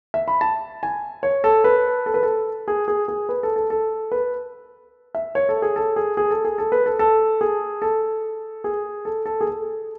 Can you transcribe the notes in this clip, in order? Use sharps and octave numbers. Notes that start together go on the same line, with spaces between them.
E5
B5
A5
G#5
C#5
A4
B4
A4
B4
A4
G#4
G#4
G#4
B4
A4
A4
A4
B4
E5
C#5
A4
G#4
A4
G#4
G#4
A4
G#4
A4
B4
A4
A4
G#4
A4
G#4
A4
A4
G#4
A4